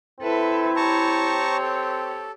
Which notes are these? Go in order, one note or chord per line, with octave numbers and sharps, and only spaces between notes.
C4 E4 A4 B4 E5
G4 C#5 A5 A#5 C#6
A4